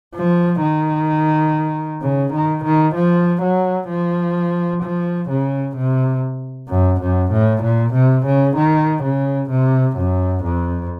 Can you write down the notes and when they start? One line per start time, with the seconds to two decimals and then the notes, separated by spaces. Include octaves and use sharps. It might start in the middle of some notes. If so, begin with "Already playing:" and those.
0.15 F3
0.62 D#3
2.02 C#3
2.33 D#3
2.64 D#3
2.95 F3
3.42 F#3
3.89 F3
4.83 F3
5.30 C#3
5.77 C3
6.69 F#2
7.01 F#2
7.32 A2
7.63 A#2
7.94 C3
8.26 C#3
8.56 D#3
9.03 C#3
9.50 C3
9.97 F#2
10.44 F2